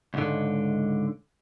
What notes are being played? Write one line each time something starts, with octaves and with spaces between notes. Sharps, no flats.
C#2 G#2 D3